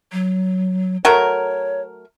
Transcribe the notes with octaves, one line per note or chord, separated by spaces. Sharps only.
F#3
F#3 A3 A#4 C#5